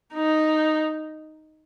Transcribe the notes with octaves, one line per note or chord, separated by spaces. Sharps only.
D#4